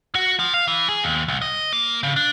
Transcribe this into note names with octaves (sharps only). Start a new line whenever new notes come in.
F#4
F3
F5
E3
G#4
D#2
C2
D#5
A#3
C#3
D4